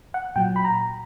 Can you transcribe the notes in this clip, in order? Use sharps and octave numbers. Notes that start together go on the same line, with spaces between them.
F#5
A#2 F#3 G5
B5
A#5